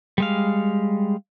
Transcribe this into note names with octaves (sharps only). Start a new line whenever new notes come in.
G3 G#3 F5